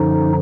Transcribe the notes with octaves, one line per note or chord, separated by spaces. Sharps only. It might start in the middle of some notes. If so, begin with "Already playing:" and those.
Already playing: F#2 D3 F3 D#4